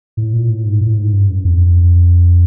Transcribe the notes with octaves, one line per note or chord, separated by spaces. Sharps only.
A2
A#2
A2
G#2
A2
G#2
G2
F#2
F2